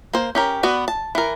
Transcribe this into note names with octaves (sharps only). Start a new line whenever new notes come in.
A#3 C5
C#4 G4 A#4
B3 F#4 B4 D5
A5
E3 A#4